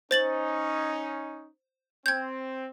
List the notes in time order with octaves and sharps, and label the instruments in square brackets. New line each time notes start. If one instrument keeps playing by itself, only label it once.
[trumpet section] C#4 D#4 [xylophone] C5 A6 F#7
[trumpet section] C4 [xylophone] G6 G#6